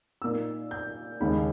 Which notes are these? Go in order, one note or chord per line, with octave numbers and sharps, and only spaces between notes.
A#2 A#3 D#4 E6
G6
D#2 C#3 G#3 D#4 B5